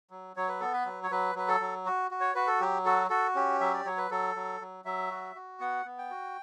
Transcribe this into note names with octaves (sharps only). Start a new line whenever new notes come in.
F#3
F#3 C#5
B4
B3 A4
B4
F#3
C#5
F#3 B4
F#3 B4
A4
F#3
F#4
F#4
C#5
F#4 B4
A4
F#3 G4
F#4 A4
F#4 A4
C#4 G4
F#3 E5
D5
F#3 C#5
B4
F#3 A4
F#3
F#3
F#3 E5
F#4
F#4
B3 F#5
B3
G5
F#4